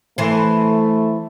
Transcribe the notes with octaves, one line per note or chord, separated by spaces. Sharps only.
E3 A3 C5